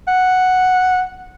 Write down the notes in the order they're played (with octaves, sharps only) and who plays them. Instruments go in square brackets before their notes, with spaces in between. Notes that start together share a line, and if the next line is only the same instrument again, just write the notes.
[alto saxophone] F#5